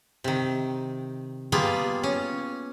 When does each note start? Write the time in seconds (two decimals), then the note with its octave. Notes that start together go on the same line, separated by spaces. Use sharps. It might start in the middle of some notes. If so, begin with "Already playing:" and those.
0.24 C3 D#3
1.52 G3 A#3 B3 F4 G#4
2.03 C#4